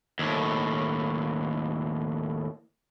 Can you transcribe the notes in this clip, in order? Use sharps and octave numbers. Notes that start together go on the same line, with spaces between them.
D#2 A2